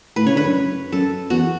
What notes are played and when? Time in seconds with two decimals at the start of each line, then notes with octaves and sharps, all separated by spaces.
0.16 A2 B4
0.26 C#3 C#5
0.35 D3 B4
0.45 F#2
0.92 F#2 A4
1.30 E2 F#4